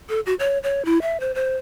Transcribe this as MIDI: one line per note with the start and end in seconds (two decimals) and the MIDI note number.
0.09 0.20 69
0.26 0.34 66
0.40 0.58 73
0.63 0.85 73
0.85 1.01 64
1.02 1.20 76
1.20 1.34 72
1.35 1.57 72